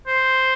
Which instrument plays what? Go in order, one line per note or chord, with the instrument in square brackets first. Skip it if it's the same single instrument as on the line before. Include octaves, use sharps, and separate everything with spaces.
[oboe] C5